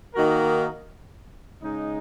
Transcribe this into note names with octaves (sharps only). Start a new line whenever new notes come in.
D#3 A#3 D#4 F#4 A#4
C#3 G#3 D#4